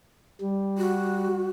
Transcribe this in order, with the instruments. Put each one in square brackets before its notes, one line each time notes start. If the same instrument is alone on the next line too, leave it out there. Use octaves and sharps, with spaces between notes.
[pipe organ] G3
[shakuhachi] F#4